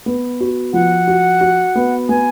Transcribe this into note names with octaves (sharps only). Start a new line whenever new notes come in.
B3
F#4
F3 F#5
F#4
F#4
B3
B3 G#5